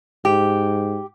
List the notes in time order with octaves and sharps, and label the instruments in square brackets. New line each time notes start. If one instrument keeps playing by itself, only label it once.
[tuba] G#2 [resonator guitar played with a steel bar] G4